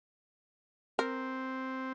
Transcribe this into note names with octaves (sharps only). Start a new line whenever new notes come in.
C4 A#4